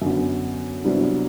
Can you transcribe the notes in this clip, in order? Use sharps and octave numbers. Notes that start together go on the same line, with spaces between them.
F#2 D3 F#3 B3
C2 C3 F#3 B3 D4